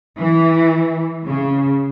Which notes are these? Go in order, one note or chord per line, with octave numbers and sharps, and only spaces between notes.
E3
C#3